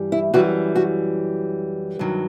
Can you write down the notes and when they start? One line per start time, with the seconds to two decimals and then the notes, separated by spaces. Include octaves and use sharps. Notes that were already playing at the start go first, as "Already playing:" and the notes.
Already playing: G2 E3 G3
0.12 E4
0.34 F#2 E3 G3 F#4
0.76 F#4
1.99 G2 D#3 F#3